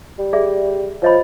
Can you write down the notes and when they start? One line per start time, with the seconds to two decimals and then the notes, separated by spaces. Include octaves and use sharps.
0.19 G3
0.33 G#4 D5 E5
1.02 F3 C#5 D#5 B5